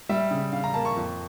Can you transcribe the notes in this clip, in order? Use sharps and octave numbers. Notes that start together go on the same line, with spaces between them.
G3 E5
C#3
C#3 F5
A#5
A#3 A5
C#6
F2